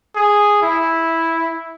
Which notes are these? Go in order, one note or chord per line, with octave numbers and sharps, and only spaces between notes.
G#4
E4